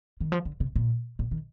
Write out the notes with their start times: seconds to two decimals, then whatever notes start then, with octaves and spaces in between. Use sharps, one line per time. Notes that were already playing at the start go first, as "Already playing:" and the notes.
0.21 D#3
0.32 F3
0.45 D3
0.60 C3
0.76 A#2
1.19 A#2
1.31 D#3